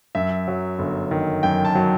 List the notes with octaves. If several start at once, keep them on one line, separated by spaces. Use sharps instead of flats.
F#2 E5
F#3
G1
D#3
F#2 G5
A5
F#3